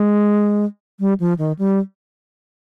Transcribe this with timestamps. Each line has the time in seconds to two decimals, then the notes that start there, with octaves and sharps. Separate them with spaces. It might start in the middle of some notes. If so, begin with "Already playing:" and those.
Already playing: G#3
1.00 G3
1.20 F3
1.39 D#3
1.59 G3